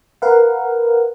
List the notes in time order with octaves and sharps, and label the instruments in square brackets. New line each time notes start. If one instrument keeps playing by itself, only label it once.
[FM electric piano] A#4 B4 F5 F#5